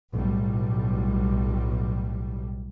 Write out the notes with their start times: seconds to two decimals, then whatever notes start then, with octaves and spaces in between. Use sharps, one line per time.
0.14 B1 A2 G3